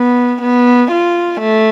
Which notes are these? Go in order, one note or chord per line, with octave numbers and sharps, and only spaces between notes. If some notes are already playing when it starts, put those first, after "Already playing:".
Already playing: B3
B3
F4
A3